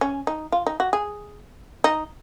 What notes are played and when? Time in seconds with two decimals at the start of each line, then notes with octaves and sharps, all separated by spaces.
0.01 C#4
0.27 D#4
0.52 F4
0.66 D#4
0.80 F#4
0.93 G#4
1.84 D#4